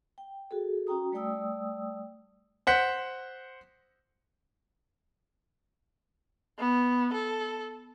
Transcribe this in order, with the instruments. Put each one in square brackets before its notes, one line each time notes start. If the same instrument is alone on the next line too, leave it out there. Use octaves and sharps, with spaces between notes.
[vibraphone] G5
F#4 G#4 A4
C#4 F#4 G5 A#5 D#6
G3 A3 D5 G5 D#6 E6
[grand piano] C5 F#5 B6
[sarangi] B3
A4